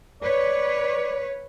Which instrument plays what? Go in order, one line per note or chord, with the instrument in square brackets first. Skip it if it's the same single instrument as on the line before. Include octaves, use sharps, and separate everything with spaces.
[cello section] B4 C#5 [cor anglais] D5